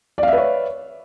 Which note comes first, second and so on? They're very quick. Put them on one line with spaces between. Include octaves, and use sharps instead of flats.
D5 F5 E5 B4 C#5